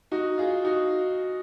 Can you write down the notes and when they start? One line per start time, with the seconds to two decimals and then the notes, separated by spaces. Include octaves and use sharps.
0.12 D#4 F#4
0.38 F4 G#4
0.64 D#4 F#4